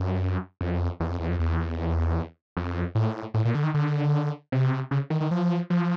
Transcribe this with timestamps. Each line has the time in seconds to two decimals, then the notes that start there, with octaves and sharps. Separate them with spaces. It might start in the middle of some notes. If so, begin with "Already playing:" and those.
Already playing: F#2
0.61 F2
1.00 E2
1.10 F2
1.20 E2
1.29 F2
1.39 E2
2.57 F2
2.95 A2
3.34 A2
3.45 A#2
3.55 D3
3.64 D#3
3.74 D3
4.52 C3
4.91 C#3
5.10 D#3
5.20 D#3
5.31 F3
5.70 F3